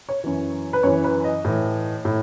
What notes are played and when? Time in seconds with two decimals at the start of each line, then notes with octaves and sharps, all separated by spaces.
0.09 C#5
0.24 F#2 E3
0.73 B4
0.83 F#2 E3 C#5
1.04 B4
1.24 D#5
1.45 A2 E3
2.05 A2